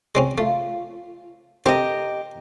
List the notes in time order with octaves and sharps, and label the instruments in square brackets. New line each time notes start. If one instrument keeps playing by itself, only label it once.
[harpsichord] G#3 C4 C#4
[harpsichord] A3 [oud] F4
[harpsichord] C4 [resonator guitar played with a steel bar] G4 D#5 [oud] A#4